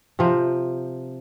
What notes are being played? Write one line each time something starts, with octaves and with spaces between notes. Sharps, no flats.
C3 F3